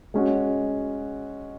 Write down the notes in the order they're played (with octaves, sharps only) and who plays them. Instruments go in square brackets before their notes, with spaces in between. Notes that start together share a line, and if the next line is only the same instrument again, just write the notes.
[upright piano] G#3 C#4 F#4